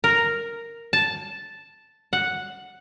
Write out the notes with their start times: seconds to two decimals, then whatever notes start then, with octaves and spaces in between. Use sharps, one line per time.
0.04 A#4
0.93 A5
2.13 F#5